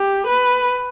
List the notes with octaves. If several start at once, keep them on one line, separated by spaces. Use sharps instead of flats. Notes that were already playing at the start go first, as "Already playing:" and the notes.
Already playing: G4
B4